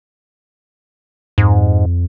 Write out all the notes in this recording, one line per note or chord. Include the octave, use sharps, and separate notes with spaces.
F2 G#2